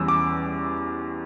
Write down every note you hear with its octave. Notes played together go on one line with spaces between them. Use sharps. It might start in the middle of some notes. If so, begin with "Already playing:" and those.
Already playing: E2 E3 G3 C#4 E6
D6